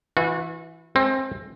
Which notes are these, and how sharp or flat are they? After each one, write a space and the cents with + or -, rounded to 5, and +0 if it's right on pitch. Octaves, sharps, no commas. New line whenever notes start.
E3 +0 F#4 -35
G#3 +30 C4 +20